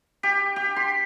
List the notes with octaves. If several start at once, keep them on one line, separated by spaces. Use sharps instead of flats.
G4
G4
C6